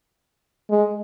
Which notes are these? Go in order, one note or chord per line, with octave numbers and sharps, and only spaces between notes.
G#3